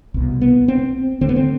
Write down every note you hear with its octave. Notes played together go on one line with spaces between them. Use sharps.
C2 B2
B3
C4
D2 D3 C4
B3
C4